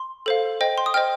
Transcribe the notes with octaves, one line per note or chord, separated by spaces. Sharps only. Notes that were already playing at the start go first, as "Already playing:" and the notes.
Already playing: C6
A4 C5 F5
C5 D#5 G5
C6
D#6
C5 D#5 G5 F6